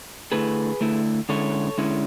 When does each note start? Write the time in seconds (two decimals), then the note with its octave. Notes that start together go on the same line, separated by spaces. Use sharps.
0.32 D3 A3 E4 G#4 B4
0.81 D3 A3 E4
1.29 D3 G#3 C#4 E4 A4 C#5
1.78 D3 G#3 C#4 E4